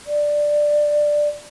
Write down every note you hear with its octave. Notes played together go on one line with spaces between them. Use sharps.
D5